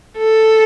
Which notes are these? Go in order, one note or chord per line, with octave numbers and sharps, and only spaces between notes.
A4